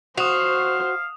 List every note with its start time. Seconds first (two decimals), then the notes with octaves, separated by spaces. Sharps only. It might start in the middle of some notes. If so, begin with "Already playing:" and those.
0.18 F#4 C5 F5 D#6 E7 F7